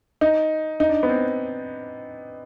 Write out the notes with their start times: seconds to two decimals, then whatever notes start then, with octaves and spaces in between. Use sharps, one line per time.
0.21 D#4
0.80 D#4
0.89 D4
1.03 B3
1.09 C4